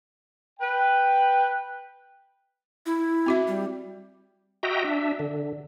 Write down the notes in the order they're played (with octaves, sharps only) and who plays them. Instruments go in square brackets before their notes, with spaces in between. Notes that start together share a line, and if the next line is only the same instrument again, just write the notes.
[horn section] B4 G5
[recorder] E4
[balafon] C4 F#4 E5
[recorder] G3
[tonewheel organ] F#4 D#5 E5 G5 A#5
D4 E5
D3